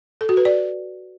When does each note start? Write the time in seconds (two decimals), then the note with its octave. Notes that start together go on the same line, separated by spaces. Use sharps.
0.21 A4
0.29 F#4
0.37 B4
0.45 D5